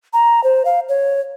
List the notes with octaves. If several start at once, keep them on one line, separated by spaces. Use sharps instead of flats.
A#5
C5
F5
C#5